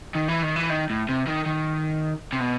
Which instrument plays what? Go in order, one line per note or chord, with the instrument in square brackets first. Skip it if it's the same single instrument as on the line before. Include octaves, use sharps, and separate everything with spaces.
[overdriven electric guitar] D#3
E3
D#3
E3
D#3
A2
C3
D#3
D#3
C3
B2